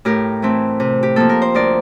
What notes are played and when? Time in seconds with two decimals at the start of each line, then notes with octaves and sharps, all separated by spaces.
0.05 A2 G4 A#4
0.42 E3 A3 C4
0.80 C3
1.03 G4
1.16 F3 A#3 A4
1.29 A#4
1.42 C5
1.54 D2 A#4 D5